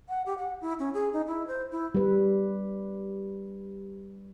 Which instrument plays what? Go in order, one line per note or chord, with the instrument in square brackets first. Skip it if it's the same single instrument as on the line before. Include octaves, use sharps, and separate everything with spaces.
[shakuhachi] F#5
G4
F#5
E4
C#4
G#4
D#4
E4
C5
E4
[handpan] G3 B4